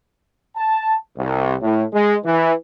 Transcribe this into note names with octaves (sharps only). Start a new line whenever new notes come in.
A5
C2
A2
G#3
E3